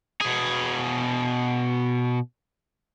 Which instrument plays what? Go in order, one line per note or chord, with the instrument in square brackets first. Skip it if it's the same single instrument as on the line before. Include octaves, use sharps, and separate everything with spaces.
[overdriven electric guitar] B2 G#4